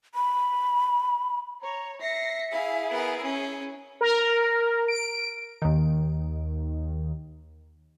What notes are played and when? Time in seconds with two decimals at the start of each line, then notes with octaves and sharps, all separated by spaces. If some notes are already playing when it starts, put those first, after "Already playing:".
0.15 B5
1.61 C#5 A#5
2.01 E5 A#6 C7 C#7
2.51 E4 G#4 F5
2.90 B3 A#4
3.23 C#4
4.01 A#4
4.88 D7
5.62 D#2 D#3